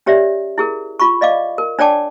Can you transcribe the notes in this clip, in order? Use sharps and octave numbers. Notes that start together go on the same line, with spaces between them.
C#4 G4 C#5 D5 E5
E4 G#4 A#4
F4 B5 C#6
D5 D#5 F5 D6
A#4
D4 C#5 D5 G5 A5 D6